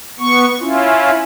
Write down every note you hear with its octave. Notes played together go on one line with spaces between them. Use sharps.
B3 C#6
C#4 E4 F4